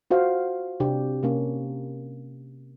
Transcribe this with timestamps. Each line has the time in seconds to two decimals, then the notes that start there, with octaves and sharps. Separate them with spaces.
0.11 F4 F#4 C5 F5
0.80 C3 D4 G4
1.23 C3 A#3 C#4